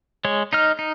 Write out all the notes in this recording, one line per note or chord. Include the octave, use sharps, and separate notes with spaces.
G#3 C#5
D#4 D#5 F6
D#4